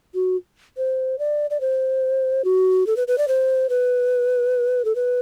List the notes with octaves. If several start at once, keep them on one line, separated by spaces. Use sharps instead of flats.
F#4
C5
D5
D5
C5
F#4
A4
B4
B4
D5
C5
B4
A4
B4